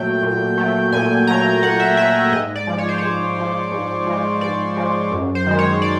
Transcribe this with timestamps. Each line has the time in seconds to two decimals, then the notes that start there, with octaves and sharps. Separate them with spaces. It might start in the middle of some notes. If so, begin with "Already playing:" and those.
Already playing: A#2 F#3 A3 G5
0.23 A#2
0.58 F#3 A3
0.92 A#2 G#5
1.27 F#3 A3 A#5
1.63 A#2 F#5
1.80 E5
1.97 F#3 E5
2.01 A3
2.32 G#2 D#5
2.55 D5
2.67 F3 G#3
2.78 C#5
2.89 C5
2.98 G#2 C#5
3.37 F3 G#3
3.72 G#2
4.07 F3 G#3
4.41 G#2 D5
4.76 F3 G#3
5.12 F#2
5.35 C5
5.47 D#3 G#3
5.59 C#5
5.82 D5